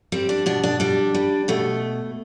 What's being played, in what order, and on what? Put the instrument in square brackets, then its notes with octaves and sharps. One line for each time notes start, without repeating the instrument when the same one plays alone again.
[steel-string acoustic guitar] G3 C4
D4
B2 D4
D4
G3 D4
G3
B2 A3